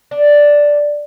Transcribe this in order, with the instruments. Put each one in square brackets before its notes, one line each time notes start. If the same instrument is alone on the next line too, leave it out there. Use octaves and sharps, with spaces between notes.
[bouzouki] D4